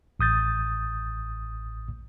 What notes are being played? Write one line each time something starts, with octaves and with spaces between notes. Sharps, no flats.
A1 D#6 G6 A6